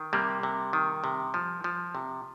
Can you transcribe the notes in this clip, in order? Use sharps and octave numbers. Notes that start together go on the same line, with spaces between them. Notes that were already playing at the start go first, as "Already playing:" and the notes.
Already playing: D#3
C3 G3 A#3
C3
D#3
C3
F3
F3
C3